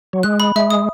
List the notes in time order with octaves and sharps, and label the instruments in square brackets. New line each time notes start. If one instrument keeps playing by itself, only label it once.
[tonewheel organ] F#3
[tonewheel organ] G#3 [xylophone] F#6
[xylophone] B5
[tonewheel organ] G#3 [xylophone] E5
[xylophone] D#6